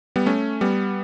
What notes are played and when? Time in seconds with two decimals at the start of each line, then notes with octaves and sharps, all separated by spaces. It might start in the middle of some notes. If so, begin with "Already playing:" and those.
0.16 G3 B3
0.26 A3 C#4
0.61 G3 B3